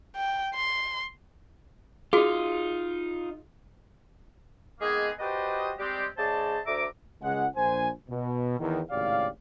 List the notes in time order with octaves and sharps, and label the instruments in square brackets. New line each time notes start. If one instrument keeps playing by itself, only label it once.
[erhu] G5
C6
[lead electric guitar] D#4 F4 [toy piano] F#4 G#4
[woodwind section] D#3 G#3 A#3 B3 G#4
F#4 G4 B4 C5 D5 D#5
G3 G#3 C4 G4
C#3 G#3 C5 D5 A5
D2 E5 A#5 D6
[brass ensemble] C#2 G#3 F#5
A#1 C5 G#5
B2
E2 D#3
G#1 A2 C#3 G4 D5 F5